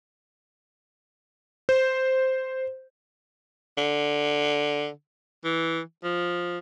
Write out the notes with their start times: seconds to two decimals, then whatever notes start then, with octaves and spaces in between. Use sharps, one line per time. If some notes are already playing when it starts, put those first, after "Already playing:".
1.69 C5
3.78 D3
5.44 E3
6.04 F3